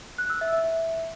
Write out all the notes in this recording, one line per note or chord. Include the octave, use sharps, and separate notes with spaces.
F#6
E6
E5
E5
E5